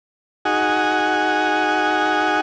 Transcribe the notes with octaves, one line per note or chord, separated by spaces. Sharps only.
D#4 F#4 G#4 F#5 G#5